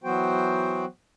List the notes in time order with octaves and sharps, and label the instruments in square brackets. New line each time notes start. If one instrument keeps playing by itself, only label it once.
[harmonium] E3 F#3 B3 F#4 C5 G5